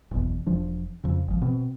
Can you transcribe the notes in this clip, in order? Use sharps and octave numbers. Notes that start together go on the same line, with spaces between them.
F#1 B1 E2 B2
E1 F3 D4
F2 C#3
G#1 F3
B2 C4